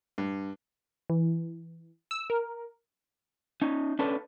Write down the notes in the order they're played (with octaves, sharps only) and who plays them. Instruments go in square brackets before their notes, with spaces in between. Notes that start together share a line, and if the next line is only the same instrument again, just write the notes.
[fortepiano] G2
[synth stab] E3
E6
A#4
[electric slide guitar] C#4 D#4
C#4 D4 A4 B4